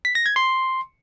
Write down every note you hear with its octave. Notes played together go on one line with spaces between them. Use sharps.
B6
A#6
G#6
C6